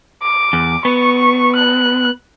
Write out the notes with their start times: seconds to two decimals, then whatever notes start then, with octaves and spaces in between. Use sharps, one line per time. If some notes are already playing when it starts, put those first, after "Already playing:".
0.23 D6
0.53 E2
0.85 B3 C#6
1.55 F#6